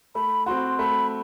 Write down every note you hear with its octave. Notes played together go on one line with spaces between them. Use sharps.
A3 B5
C4 F#4 C6
A3 B5